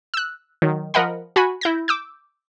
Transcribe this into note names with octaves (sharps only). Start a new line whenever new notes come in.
E6 F#6
D#3 F#3
F3 A#4 D#5 F#5 B5
F#4 G#5 B5
E4 G6 A#6
D6 E6 G6